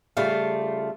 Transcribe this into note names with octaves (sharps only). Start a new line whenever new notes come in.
C#3 G3 A3 F4 F5